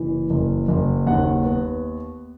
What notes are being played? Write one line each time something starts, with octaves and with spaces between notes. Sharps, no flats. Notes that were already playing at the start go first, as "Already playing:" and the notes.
Already playing: F#1 E3
F#1
F#1
D#2 F#5
B3